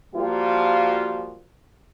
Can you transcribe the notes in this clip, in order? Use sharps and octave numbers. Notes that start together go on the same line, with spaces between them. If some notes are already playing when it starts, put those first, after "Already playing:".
F3 G3 A#3 F4 F#4